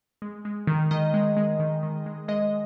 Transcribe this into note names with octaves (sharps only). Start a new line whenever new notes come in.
G#3
G#3
D#3
D#3 D#5
G#3
G#3
D#3
D#3
G#3
G#3 D#5